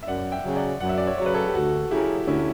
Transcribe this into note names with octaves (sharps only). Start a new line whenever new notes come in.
E5
F#2 D5 F#5
E5 G5
C#3 F#3
D5 F#5
F#2 F#5
E5
D5
C#5 E5
C#3 F#3 C#5
B4
A4 C#5
G4
D2 F#4 A4
C#3 F#3 E4 G4
D2 C#4 E4